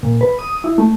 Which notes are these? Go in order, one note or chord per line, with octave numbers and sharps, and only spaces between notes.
A#2
B4
D#6
E4
A3